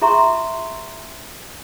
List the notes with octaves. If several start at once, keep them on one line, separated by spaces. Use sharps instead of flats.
F4 G#4 E5 A#5 C6 C#6